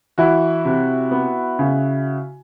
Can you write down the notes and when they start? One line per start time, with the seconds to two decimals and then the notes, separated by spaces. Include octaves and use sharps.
0.18 E3 E4 F#4
0.65 C3
1.11 B3
1.59 C#3